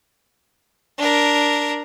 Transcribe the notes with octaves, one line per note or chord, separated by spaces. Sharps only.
D4 A#4